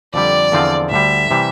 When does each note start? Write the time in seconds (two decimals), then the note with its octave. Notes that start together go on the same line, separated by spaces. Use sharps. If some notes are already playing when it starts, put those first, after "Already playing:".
0.14 F2 D3 G3 D5
0.52 E2 D3 F3 C4 F4
0.91 D2 D3 G3 E5
1.31 C3 E3 G3